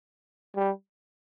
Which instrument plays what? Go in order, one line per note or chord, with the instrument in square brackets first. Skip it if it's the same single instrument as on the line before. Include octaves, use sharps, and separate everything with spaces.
[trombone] G3